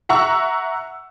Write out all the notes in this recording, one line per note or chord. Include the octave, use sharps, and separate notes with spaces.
E5 F#5 A#5 C#6 E6